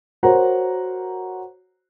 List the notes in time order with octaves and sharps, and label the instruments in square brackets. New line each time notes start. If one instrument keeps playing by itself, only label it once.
[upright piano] F#4 A#4 C5 C#5 F#5 A#5